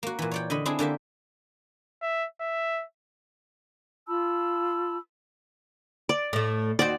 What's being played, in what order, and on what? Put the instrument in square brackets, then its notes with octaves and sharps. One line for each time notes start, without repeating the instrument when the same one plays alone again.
[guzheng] A#3 F#4
A#2 E3
C#5 D5 G5
D3 D#5 B5
C4 D4 E4 G#4
D3 A#3 G4 E5
[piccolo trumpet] E5
E5
[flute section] F4 A5 B5 E6
[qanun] D5
[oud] A2 A3
[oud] D#2 F#4 C5 [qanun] D5